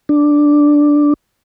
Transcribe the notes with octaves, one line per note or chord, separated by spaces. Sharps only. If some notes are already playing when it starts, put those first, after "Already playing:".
D4